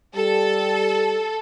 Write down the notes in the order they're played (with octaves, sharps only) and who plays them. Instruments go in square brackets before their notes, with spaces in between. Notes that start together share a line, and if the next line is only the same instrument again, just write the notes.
[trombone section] G3 G4 [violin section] A4